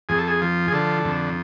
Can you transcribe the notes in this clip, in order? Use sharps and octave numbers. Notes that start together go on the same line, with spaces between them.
F2 G#4
A4
G#4
F3
G#4
D3 A4
F2